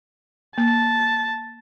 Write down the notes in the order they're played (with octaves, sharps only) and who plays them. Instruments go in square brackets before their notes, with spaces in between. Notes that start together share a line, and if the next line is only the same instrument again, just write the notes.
[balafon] A#3 [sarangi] A5